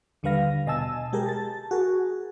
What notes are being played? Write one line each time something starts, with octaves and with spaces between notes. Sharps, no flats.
D#2 D3 G3 B4 F5 A#6
B2 D#5 G#5 A5 E6
G#3 G4 G#4 A#4
A5 A6
F#4 G#4 A#4